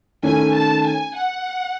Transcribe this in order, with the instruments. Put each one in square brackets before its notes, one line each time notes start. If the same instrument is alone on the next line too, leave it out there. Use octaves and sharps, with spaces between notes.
[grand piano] D#3 A3 C#4 [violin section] G#5
[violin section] A5
G#5
F#5